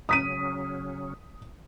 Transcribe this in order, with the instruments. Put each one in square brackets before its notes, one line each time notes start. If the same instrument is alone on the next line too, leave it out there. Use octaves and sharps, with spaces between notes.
[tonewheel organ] C#3 F#3 C#4 [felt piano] D#6 B6 D#7